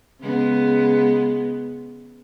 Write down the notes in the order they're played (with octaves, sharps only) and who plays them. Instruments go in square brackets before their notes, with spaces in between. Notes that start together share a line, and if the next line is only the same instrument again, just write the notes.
[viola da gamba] C#3 G#3 B3